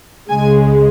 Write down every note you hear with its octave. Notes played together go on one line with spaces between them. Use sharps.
C#2 C#3 G#3 G#5